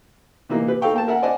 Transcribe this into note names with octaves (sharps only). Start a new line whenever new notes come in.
C3 E3 A#3 D#4
G4 B4
D#4 A4 F5 G5 C#6
A#3 G5 A5
A#4 E5 F#5 G#5
C5 D5 D#5 F#5 G#5 A5